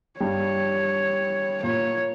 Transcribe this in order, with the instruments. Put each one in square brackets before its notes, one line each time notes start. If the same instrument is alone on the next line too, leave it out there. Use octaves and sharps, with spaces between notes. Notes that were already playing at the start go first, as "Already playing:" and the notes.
[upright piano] G2 G3 [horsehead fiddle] C#5
[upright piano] A#2 A#3 [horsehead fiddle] C#5